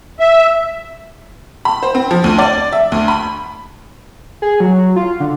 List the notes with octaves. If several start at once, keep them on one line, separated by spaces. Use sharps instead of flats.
E5
B5
C5
C4
F3
D2
D5
E5
D2
B5
G#4
F#3
F4
D3